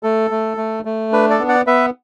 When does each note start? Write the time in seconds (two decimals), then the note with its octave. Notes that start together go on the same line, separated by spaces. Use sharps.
0.03 A3 A4
0.31 A3
0.57 A3
0.85 A3
1.12 D4 B4
1.30 A4 D5
1.39 B3
1.49 D5 F#5
1.67 B3 B4 E5